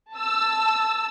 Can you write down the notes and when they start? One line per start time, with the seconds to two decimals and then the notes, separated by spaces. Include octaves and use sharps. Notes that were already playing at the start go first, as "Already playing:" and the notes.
0.15 A5 E6